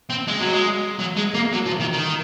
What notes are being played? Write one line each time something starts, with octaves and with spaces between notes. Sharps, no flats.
C4
G#3
F#3
G#3
F#3
G#3
A#3
F#3
F3
D#3
D#3